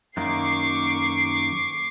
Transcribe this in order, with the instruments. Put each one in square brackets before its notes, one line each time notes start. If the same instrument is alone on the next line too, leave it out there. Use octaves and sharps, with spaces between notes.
[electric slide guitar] F#2 D#3 A#3 [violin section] C#6 D6 C7